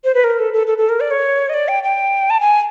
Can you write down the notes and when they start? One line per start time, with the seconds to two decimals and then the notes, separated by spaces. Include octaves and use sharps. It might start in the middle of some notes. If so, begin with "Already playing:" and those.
0.04 C5
0.15 B4
0.24 A#4
0.39 A4
0.53 A4
0.67 A4
0.78 A4
0.89 A#4
1.00 D5
1.11 C#5
1.49 D#5
1.54 D5
1.68 G5
1.83 G5
2.30 A5
2.41 G#5